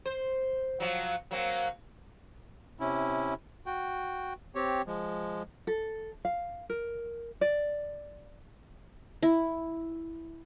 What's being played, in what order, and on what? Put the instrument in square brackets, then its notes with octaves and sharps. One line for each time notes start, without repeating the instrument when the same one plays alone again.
[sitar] C5
F3 F#3
F#3 A#3 C4
[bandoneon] C3 C#4 E4
F#4 G5
C4 G4 C#5
F3 G#3
[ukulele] A4
F5
A#4
D5
[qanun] E4